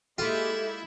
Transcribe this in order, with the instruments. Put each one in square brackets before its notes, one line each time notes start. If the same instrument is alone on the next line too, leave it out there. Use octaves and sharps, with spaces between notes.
[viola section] G#3 A#3 G4 [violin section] E4 E5 [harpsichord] F4 [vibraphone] A4